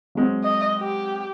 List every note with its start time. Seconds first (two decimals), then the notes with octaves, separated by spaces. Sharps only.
0.15 F#3 G#3 C4
0.44 D#5
0.79 G4